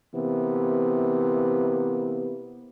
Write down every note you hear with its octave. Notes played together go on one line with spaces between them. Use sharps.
C3 E3 A#3 B3